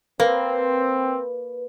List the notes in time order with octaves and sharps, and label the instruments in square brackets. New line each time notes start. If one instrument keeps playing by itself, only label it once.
[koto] A#3 [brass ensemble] C4 [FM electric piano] B4